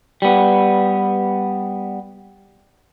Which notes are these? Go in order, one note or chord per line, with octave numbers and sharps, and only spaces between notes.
G3 B3